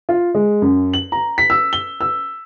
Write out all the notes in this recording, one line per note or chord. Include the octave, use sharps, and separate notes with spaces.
F4
G#3
F#2
F#7
A#5
B6
E6
G7
E6